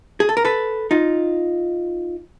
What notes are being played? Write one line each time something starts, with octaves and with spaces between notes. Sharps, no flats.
G#4
A4
A#4
A4 B4
D#4 F4